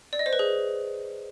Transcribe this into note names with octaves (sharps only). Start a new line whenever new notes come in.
D5
D#5
C5
B4
G#4